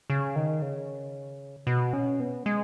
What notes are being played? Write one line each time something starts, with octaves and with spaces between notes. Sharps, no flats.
C#3
D#3
C#3
B2
C#4
B3
G#3